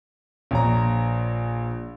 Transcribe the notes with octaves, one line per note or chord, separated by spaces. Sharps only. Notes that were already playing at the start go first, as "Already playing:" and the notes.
A#1 C#5 A#5